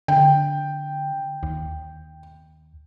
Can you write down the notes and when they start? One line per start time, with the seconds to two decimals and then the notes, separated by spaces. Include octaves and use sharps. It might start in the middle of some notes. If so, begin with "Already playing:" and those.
0.08 D3 G5
1.43 D#2